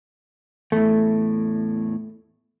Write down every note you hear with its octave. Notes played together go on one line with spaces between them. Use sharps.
E2 A2 A3